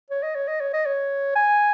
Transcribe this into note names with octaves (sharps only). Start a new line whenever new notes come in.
C#5
D#5
C#5
D#5
C#5
D#5
C#5
G#5